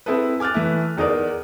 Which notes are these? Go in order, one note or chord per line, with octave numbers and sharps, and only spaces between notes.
C4 E4 G#4 A4 B4
G#5 D6 F6 F#6 A6
E3 A3 E4
E2 D#4 G#4 A#4 D5